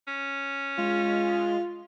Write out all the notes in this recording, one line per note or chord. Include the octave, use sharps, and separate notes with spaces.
C#4
G#3 F4